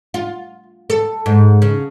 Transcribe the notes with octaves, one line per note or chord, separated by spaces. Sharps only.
F4
A4
G#2
C#3